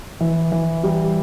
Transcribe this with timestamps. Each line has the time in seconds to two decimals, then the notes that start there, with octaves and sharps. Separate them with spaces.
0.20 E3
0.52 E3
0.83 G3